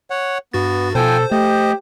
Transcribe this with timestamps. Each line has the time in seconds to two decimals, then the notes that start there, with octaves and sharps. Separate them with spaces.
0.10 C#5 F#5
0.54 G2 B3 F#4 A6
0.95 B2 F3 A4 C5 G5 G#5
1.32 A3 G4 D#5